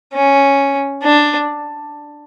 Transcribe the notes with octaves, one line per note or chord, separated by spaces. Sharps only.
C#4
D4